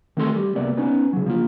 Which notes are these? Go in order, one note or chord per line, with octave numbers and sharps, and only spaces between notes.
D#3 A3 C4 A4 C6
G3
C#2 C3 A#3 B3 D5
B3 C#4 D#4
C#3 F#3
F3 A#3 F4